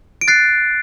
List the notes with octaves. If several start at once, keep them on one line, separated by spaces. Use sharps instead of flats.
D7
F#6 A6 C7